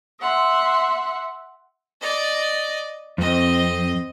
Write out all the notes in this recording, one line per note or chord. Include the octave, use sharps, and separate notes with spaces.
E5 F#5 C6
D5 D#5
F2 C4 D#5